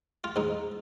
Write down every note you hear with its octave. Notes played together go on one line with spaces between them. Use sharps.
F4
G#2 D#4